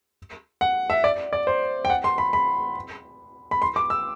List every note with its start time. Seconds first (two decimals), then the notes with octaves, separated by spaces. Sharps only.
0.61 F#5
0.90 E5
1.04 D5
1.33 D5
1.47 C5
1.85 G5
1.90 F#5
2.04 C6
2.18 B5
2.33 B5
3.51 B5
3.62 C6
3.76 D6
3.90 E6